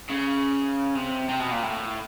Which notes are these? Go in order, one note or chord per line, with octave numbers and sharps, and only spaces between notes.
C#3
C3
C3
B2
A#2
A2